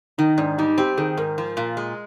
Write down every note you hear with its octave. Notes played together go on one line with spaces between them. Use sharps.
D#3 D#4
G#2 D4
G3 D#4
C4 G4
D#3 G#4
G#2 A#4
F3
A#2
G#3